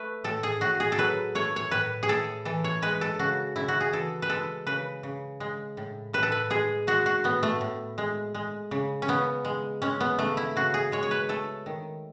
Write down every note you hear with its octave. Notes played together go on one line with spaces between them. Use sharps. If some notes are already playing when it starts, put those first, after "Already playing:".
Already playing: A3 B4
A2 A4
G#4
A2 F#4
G#4
A4
F#3 B4
A3 C#5
C#5
A2 B4
G#4
A2 A4
E3 A4
C#5
G#3 B4
A4
C#3 F#4
C#3 E4
F#4
G#4
E3 A4
B4
G#3 A4
C#3 B4
C#3
G#3
A2
A2 B4
A4
B4
G#3 G#4
G#3 F#4
F#4
A2 B3
A3
A2
G#3
G#3
C#3
C#4
C#3 B3
G#3
G#3 C#4
B3
C#3 A3
E4
C#3 F#4
G#4
G#3 C#5
C#5
B4
A3 A4
D#3